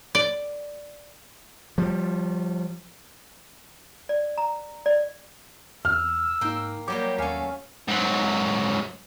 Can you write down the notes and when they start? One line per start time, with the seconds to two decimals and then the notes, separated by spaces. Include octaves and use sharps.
0.15 D5
1.78 F3 G3
4.09 D5
4.38 A#5
4.86 D5
5.85 E2 E6 F6
6.41 G#2 A#3 D#4 A#4 G5
6.88 F#3 G3 A#3 G4 D6
7.18 D#2 A3 C#4 F5 G#5
7.88 G#2 F#3